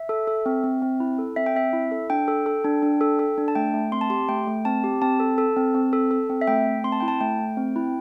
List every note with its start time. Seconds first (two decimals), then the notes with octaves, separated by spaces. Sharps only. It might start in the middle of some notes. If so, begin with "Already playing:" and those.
Already playing: E5
0.09 A4
0.27 A4
0.46 C4
0.64 C4
0.82 C4
1.00 E4
1.19 A4
1.36 C4 E5
1.46 G5
1.55 C4 E5
1.73 E4
1.91 A4
2.10 D4 G5
2.28 A4
2.46 A4
2.64 D4
2.83 D4
3.01 A4
3.19 A4
3.38 D4
3.48 A5
3.55 A3 G5
3.74 A3
3.92 C4 C6
4.01 A5
4.10 G4 C6
4.28 A3 G5
4.47 A3
4.65 C4 A5
4.84 G4
5.02 C4 A5
5.20 A4
5.38 A4
5.57 C4
5.75 C4
5.93 A4
6.11 A4
6.30 C4
6.41 E5
6.47 A3 G5
6.66 A3
6.84 C4 C6
6.92 A5
7.00 E4 G5
7.08 A5
7.20 A3 G5
7.39 A3
7.57 C4
7.76 E4